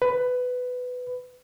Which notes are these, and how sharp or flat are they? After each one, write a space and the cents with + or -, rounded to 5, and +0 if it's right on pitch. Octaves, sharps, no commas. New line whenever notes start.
B4 +15